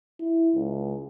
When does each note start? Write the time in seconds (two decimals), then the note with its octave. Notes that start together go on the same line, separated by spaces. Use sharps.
0.20 E4
0.55 C#2